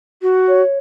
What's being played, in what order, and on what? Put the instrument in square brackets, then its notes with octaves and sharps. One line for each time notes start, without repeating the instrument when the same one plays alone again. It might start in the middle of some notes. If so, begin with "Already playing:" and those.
[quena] F#4
[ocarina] C#5